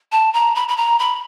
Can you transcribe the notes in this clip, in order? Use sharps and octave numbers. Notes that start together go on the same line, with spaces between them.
A5
A#5
B5
B5
A#5
B5